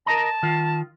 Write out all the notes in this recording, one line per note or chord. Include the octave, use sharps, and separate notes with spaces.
A#4 D#5 A5 A#5
D#3 F4